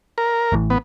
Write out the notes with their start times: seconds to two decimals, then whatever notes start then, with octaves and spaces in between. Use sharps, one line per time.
0.18 A#4
0.52 A1 A2 E3
0.70 B3